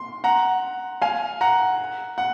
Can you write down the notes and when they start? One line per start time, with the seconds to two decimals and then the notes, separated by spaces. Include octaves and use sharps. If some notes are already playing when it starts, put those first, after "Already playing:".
Already playing: C6
0.24 F#5 A#5
1.02 F5 G#5
1.41 F#5 A#5
2.18 F#5